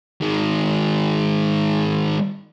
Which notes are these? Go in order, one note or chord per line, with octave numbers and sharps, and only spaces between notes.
D#3 G#3